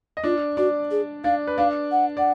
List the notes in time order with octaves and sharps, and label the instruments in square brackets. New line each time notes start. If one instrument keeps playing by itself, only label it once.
[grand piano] D#5
[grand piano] D4 D5 [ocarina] F4
[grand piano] D4 D5 [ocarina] F#4
[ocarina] G#4
[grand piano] D4 D5 [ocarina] F5
[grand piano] B4
[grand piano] D4 D5 [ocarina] F5
[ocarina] F#5
[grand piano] D5 [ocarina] F#5